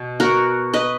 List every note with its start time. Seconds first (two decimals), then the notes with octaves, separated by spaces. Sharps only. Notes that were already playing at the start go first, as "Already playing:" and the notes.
Already playing: B2
0.20 F#4 A#4
0.73 B4 D#5